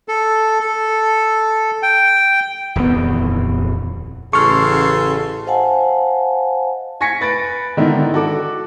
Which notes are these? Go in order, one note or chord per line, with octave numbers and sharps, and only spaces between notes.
A4
A4
G5
D#1 F2 E3 B3
A1 C#3 A4 C6 C#6 F6
C5 D#5 F5 F#5 G#5 A5
G#5 C#6 G#6 A#6 B6 C#7
B4 A6 A#6 D7
G#2 D3 D#3 B3 D#4 E4
F#4 A4 D6